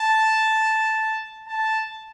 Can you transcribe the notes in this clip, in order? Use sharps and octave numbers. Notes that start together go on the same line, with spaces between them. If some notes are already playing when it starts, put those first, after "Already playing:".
Already playing: A5
A5